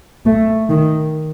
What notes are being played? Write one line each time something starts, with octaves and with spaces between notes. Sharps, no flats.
A3
D#3